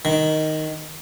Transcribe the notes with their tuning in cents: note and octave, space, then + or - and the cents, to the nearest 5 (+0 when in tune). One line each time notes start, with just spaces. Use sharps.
D#3 +0